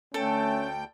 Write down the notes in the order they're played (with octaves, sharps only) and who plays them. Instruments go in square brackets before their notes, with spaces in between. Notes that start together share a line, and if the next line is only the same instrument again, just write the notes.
[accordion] D2 G5 G6 [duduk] A3 [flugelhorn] C#4 [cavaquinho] A4